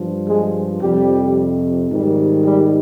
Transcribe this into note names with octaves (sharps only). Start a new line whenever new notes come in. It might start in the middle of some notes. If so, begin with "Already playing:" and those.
Already playing: G2 F3
G#3 G#4
F2 C3 F3 G3 G4
G#2 D#3 G3
G3 G4